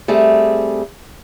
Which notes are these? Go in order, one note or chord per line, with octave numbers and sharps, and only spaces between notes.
G3 A3 C4 G#4